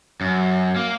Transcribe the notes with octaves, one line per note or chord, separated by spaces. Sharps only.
F#2
A#3